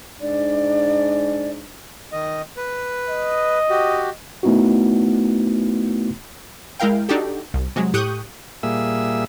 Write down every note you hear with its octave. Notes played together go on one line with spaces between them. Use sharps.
G#2 D4 D5
D#3 D#5
B4
D#5
F#4 G4
A3 B3 D#4 E4 F#4
G#3 E4 A#4 F5 G5
D4 D#4 F#4 G4 A4
C2
C3 F#3 G#3
A2 G4 C#6 D#6 F#6 G6
A#2 G3 A#3 G#4 E5 E6